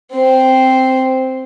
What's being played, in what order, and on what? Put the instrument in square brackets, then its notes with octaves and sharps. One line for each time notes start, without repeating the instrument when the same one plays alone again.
[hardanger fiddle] C4 C5